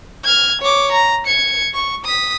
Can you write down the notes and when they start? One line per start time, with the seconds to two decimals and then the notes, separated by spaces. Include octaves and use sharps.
0.24 F6 G#6
0.61 C#5 D6
0.92 A#5
1.27 G#6 C#7
1.74 C#6
2.05 D#6 B6